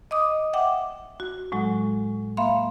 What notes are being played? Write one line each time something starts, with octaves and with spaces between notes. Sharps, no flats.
D#5 D6 D#6
E5 F#5 G5 D6
F#4
A2 F#3 G#3
A#3 E5 F5 B5 C6